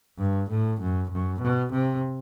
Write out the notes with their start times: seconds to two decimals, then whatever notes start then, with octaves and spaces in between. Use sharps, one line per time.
0.19 G2
0.49 A2
0.80 F#2
1.10 F#2
1.41 B2
1.72 C3